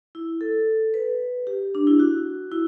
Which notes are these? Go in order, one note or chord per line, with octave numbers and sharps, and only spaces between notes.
E4
A4
B4
G4
D4
E4
F#4
E4